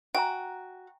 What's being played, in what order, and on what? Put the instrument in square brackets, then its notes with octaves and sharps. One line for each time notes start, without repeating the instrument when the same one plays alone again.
[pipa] F#4 [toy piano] E5 G#5 A#5 [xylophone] G5